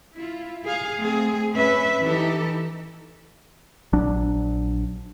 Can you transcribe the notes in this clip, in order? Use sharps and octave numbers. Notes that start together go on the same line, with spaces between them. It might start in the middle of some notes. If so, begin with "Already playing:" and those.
E4 F4
G#4 F5
A3 C4 G#4
C#4 B4 E5
E3 D#4 G4 A4
A#1 F#3 D4